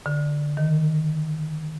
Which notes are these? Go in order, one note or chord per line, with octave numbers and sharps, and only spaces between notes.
D3
D#3